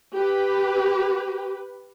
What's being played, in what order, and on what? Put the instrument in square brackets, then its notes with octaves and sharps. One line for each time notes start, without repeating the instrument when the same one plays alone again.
[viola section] G4 B4